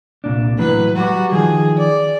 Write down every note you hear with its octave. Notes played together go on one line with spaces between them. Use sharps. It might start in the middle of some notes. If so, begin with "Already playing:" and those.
C2 A#2 D4
A2 E3 F#3 B4
F#3 G3 F#4
D#3 F3 G#4
D5